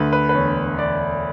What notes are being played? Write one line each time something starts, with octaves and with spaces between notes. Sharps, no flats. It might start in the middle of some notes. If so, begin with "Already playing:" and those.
Already playing: D2 D3 B4
B4
B4
E1 C#5
E1 D5